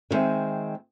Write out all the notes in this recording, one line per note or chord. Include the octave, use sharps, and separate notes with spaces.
D3 D#3 G#3 C4 E5